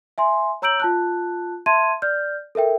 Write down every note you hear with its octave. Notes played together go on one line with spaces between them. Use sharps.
E5 G#5 C6
C#5 A#5 E6 G6 D7 F#7
F4 A5 F#6
E5 A5 C6 G#6 D#7
D5 F6 G6
A4 A#4 E5 G5